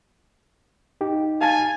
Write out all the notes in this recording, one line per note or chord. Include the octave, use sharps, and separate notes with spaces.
D#4 G4
F5 G#5 A5